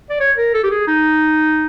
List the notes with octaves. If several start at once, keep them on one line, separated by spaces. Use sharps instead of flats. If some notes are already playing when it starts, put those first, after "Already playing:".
D5
C#5
A#4
A4
G4
G#4
D#4